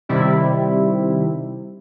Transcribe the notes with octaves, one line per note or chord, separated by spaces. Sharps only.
C3 D#3 G3 C4 E4